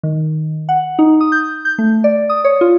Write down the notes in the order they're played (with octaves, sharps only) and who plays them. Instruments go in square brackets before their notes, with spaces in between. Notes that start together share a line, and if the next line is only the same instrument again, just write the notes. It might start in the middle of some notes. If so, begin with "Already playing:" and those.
[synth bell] D#3
F#5
D#4
D#6
G6
G6
A3
D5
D#6
C#5
F4